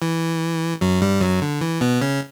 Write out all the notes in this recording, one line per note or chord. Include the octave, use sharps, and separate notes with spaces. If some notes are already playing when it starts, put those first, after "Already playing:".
E3
F#2 F#3
G2 G3
F#2 F#3
D3
E3
B2 B3
C#3 C#4